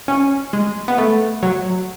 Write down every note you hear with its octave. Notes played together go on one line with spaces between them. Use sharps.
C#4
G#3
B3
A3
F#3